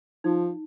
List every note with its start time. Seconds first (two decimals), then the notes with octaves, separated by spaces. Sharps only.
0.24 F3 D#4